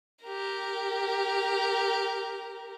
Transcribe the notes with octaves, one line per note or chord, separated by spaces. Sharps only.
G4 A#4